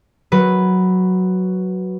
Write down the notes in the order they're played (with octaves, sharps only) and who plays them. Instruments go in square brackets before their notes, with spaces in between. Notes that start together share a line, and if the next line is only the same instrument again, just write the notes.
[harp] F#3 B4